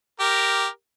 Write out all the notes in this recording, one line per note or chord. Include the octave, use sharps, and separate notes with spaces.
G4 A#4